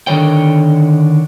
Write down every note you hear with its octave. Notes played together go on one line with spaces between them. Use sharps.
D3 D#3 C#5 G5